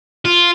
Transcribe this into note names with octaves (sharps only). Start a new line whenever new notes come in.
F4